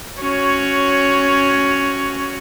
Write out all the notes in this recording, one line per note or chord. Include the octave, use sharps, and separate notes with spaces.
C#4 F#4 C#5